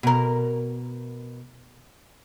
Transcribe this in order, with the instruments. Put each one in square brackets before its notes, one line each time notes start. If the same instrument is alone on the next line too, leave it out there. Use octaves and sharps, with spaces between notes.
[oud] B2 A#4